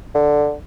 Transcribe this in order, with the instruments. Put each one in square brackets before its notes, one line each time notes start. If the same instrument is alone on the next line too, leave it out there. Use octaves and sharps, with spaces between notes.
[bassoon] D3